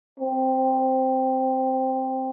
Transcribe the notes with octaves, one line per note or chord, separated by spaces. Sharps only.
C4